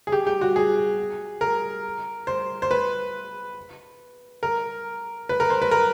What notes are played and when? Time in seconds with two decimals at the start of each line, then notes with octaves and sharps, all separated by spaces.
0.07 G#4
0.12 G4
0.27 G4
0.41 F#4
0.56 G#4
1.41 A#4
2.27 C5
2.62 C5
2.71 B4
4.43 A#4
5.29 B4
5.40 A#4
5.50 C5
5.62 B4
5.71 A#4